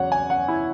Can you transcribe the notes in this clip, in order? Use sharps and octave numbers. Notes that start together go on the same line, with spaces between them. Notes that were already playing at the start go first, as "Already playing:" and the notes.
Already playing: E2 C#3 F#3 C#5 F#5
G#5
F#5
E4